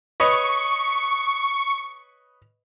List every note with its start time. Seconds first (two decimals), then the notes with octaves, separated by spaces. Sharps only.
0.20 B4 C#5 D#5 C#6